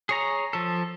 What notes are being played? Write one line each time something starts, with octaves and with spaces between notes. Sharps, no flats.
G#4 C#5 A#5
F3 A4